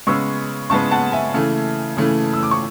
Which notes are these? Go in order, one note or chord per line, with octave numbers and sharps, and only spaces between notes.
C#3 G#3 B3 C#6 E6
C#3 G#3 B3 A5 C#6
F#5 A5
E5 G#5
C#3 E3 A3
C#3 E3 A3
E6
D6
C#6